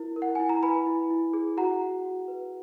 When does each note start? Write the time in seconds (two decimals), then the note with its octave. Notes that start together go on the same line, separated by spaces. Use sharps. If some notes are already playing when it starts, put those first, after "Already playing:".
Already playing: E4 A#4
0.16 A#4
0.22 F#5
0.35 E4 G#5
0.49 A#5
0.63 B4 G#5 B5
0.86 E4
1.11 E4
1.33 G#4
1.57 F#4 F#5 A#5
1.81 F#4
2.05 F#4
2.28 B4